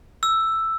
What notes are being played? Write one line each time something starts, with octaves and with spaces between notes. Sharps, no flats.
E6